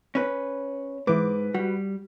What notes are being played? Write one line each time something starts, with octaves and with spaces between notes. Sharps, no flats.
C#4 B4
G#2 E3 B4 D6
G3 F#4